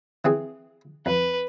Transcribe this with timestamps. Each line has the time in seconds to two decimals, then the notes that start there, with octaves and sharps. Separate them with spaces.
0.25 E3 C4 G#4
1.06 F2 B4